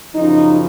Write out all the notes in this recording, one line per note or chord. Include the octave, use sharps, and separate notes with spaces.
F#2 C#3 F3 D#4